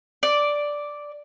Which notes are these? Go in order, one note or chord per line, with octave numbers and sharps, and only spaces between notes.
D5